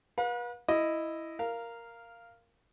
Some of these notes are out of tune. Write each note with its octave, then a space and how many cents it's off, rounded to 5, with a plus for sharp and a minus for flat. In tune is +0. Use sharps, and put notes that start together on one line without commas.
B4 -35 F5 +45
E4 +0 D#5 +0
A#4 +0 F5 -10